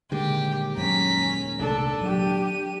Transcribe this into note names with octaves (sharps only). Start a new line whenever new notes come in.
D#1 D#2 D3 G#3 G4
F#2 C#4 A#5 B6
C2 C3 A3 D4 A4
F#3 D4 G4 D#7